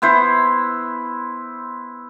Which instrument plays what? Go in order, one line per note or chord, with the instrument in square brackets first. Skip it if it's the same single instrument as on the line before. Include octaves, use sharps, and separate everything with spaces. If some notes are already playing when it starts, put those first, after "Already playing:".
[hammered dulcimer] B3 E4 C5